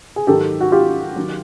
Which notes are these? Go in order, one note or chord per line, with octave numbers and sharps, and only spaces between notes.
G#4
G#2 D#3 F#3 G4 A4
F#4
F4 G4
D#3 F#3